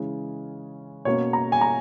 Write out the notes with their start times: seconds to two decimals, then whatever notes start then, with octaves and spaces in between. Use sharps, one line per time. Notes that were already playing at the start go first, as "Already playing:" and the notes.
Already playing: C#3 E3 G#3 C#4
1.05 B2 A#3 C#4 C#5
1.33 A#5
1.52 G#5
1.61 A#5